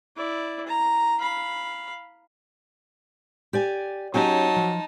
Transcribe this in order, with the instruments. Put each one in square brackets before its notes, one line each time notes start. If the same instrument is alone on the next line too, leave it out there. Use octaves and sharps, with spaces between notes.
[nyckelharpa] E4 D5
A#5
F5 B5
[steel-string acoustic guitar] G4 D5 G#5
[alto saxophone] F#3 [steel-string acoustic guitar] C#4 G4 G#5 [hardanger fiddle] D#4 A5
[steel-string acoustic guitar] F3